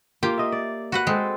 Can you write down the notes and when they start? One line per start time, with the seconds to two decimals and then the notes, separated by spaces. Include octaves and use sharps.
0.23 A#3 F4 G4
0.38 D#5 E5
0.52 D5
0.92 F#4 B4 F#5
1.07 G#3 C4 A4 C5